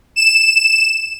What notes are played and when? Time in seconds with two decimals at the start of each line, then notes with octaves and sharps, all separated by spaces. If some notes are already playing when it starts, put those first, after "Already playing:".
0.16 E7